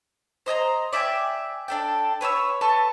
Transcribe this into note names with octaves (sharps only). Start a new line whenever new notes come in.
C5 D#5 G#5 A#5
D5 E5 G5 G#5
D4 A4 G5
B4 C#5 E5 E6
A4 B4 A5 C#6